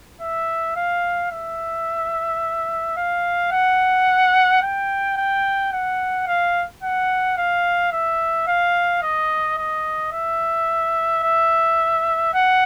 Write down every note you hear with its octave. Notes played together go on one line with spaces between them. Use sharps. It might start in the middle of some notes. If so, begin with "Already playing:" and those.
E5
F5
E5
F5
F#5
G5
G5
F#5
F5
F#5
F5
E5
F5
D#5
D#5
E5
E5
F#5